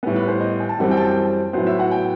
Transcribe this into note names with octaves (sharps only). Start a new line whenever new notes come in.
A2 G3 B3 B4
B4
C5
D#5
G5
A5
F#2 E3 G3 C4 F#5
G5
A5
G5
A2 F#3 B3 C5
E5
F#5
G5